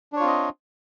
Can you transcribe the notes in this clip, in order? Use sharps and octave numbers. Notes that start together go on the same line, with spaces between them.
C4 D4 F4 C#5 D#5